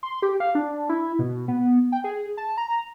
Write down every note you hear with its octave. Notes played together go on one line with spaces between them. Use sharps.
C6
G4
F5
D4
E4
B2
B3
G5
G#4
A5
A#5